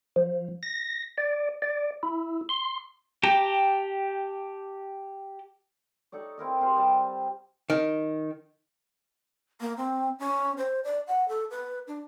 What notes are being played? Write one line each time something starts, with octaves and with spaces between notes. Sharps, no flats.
F3
A#6
D5
D5
E4
C6
G4 G5 A5 A#5
D#4 A4 C#5 D5
C4 E4 A#4 D#5
C3 F4 G#4 C5
G3 A5
D#3
A#3
C4
C#4
C5
D5
F#5
A4
B4
D4